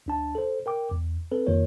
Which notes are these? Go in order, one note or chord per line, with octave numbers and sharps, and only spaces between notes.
D2 D4 A5
A4 C5
A#4 G5 D6
E2
C4 A4 B4
F2 D#3 A#3 F4 A#4 C#5